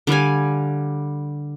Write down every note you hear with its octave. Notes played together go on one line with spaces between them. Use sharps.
D3 G3 F5 G#5